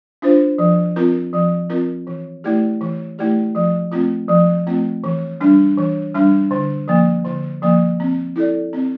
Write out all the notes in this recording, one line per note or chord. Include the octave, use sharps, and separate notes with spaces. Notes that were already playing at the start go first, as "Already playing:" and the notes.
D4 F4 C5
F3
C4 F4 A#4
F3
C4 F4 A#4
E3
A3 E4 G4 D5
E3
A3 E4 G4 D5
F3
A3 C4 F4
F3
A3 C4 F4
E3
G3 D4
E3
G3 D4
D3
F3 A#3
D3
F3 A#3
C4
E4 A4 D5
C4